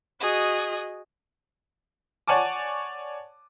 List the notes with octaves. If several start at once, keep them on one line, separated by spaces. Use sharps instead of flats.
F#4 G#4 D#5
C#5 D5 F#5 G#5 A5 D6